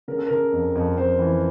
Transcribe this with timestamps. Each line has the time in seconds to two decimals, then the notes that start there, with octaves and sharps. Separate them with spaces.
0.08 C#3 A#4
0.18 A4
0.27 C#3 A#4
0.52 F2
0.75 F2
0.97 F2 C5
1.19 E3